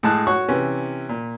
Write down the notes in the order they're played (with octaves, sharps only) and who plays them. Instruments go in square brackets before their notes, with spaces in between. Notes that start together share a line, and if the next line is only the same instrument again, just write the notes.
[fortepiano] A2 G#3 A5 F#6
F#4 C#5 F#5 C#6
C3 E3 C#4
A#2